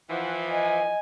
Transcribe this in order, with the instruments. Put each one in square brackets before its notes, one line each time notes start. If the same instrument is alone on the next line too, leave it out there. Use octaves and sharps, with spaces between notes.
[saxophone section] E3 F3 [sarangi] F#5
[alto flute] D#5 [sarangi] G#5